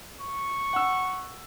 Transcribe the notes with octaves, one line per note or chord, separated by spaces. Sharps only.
C#6
F#5 E6